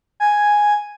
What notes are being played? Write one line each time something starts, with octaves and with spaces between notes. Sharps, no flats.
G#5